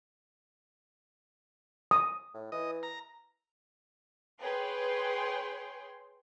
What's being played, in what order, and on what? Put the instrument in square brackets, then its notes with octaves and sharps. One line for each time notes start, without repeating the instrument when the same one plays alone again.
[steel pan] D#6
[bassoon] A2
[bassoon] E3 [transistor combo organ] D#5
[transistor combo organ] A#5
[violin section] G#4 B4 C#5 G5 C6